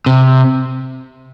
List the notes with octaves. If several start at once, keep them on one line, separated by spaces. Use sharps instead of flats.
C3